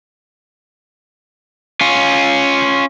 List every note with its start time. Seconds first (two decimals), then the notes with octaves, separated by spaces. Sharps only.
1.81 C#4 F4